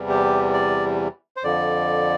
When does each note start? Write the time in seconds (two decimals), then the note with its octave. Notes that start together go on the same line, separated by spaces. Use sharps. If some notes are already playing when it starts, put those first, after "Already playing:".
Already playing: E2 C3 E3 G3
0.09 G4
0.53 D5
1.37 C5
1.44 F2 D3 F3 D5